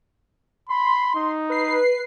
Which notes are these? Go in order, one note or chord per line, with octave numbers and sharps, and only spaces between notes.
B5 C6
D#4
B4 C7